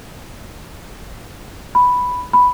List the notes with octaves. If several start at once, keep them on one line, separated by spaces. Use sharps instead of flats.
B5
B5